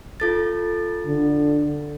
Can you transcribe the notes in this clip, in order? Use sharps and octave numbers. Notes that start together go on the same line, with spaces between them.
F4 A4 A6
D3